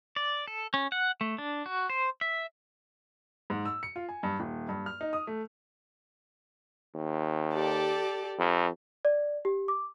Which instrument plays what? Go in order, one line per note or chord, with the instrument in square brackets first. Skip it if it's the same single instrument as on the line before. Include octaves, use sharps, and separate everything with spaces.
[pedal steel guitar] D5
A4
C#4
F#5
A3
D4
F#4
C5
E5
[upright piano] G#2
E6
C#7
F4
G#5
G2
D#1
G2
F6
D#4
D#6
A3
[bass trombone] D#2
[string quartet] G4 A4 D5
[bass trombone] F2
[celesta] D5
G4
D6